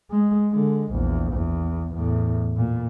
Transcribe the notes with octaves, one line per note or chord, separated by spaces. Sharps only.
G#3
D3 G#3
A#1 E2
E2
E2 A2
A#2